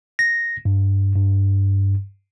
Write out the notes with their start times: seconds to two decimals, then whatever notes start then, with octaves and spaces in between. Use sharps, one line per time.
0.19 A#6
0.65 G2
1.15 G2